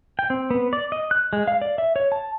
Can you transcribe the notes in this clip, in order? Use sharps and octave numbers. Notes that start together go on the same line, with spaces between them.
G5
C4
B3
D5
D#5
F#6
G#3
F5
D5
E5
C#5
A5